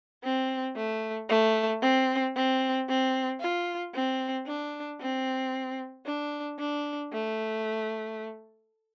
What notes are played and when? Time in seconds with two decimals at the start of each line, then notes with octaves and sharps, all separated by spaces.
0.23 C4
0.76 A3
1.29 A3
1.82 C4
2.35 C4
2.88 C4
3.40 F4
3.94 C4
4.46 D4
5.00 C4
6.06 D4
6.59 D4
7.12 A3